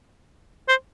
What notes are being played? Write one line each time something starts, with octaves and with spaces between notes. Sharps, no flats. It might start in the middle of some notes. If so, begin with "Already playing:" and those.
C5